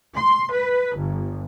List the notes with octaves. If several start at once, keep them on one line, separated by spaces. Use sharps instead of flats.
C6
B4
G1